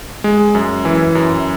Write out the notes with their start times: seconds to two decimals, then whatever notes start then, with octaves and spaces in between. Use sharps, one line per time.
0.24 G#3
0.55 F#2
0.85 E3
1.15 F#2